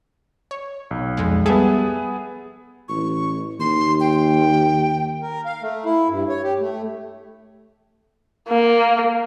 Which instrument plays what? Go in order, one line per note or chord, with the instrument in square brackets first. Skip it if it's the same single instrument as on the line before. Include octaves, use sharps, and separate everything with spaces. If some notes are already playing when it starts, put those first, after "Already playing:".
[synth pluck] C#5
[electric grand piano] B1
[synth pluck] F2 G#3
[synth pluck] G3 A4 E5 [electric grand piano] B3 G#4
[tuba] A1 [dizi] C#6
[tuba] D#2 [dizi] C6
[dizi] G5
[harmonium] A#4
F5
A3
E4
G2
C#5
G4
A3
[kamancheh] A#3